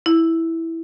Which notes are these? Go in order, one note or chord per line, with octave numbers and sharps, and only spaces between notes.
E4